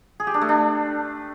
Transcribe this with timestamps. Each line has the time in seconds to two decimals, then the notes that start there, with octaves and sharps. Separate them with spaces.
0.20 G#4
0.27 G4
0.34 D4
0.41 A3
0.49 D4